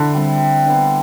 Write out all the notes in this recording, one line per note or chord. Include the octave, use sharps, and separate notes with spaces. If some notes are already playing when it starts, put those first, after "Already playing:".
Already playing: D3 E4
G3 C4
G3
B3 D4